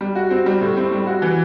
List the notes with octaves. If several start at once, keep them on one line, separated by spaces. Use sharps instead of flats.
G3
F#4
C4
G3
A2
C4
G3
F#4
E3